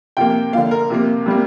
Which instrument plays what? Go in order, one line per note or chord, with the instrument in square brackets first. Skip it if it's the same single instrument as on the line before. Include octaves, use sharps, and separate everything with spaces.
[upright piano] C3 F3 A#3 G5
D3 F3 A#3 F5
A#4
C3 F3 A#3
C3 G3 A#3